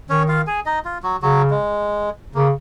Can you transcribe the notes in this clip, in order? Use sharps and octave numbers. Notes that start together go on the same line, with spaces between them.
D#3 C#4 C#5
F4 F5
G#4 G#5
D#4 D#5
F4
F#3 F#4
C#3 F#3 F#4
G#3
C#3 A#3